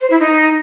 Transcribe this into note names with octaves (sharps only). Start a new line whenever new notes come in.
C5
E4
D#4